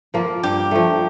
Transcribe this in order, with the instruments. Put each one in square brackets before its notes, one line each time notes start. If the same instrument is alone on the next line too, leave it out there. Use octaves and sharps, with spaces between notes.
[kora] F3 A#3 F4
[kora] G2 [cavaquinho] G4
[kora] F3 A3